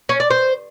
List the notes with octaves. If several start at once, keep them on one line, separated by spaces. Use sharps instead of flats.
C#4
D5
C5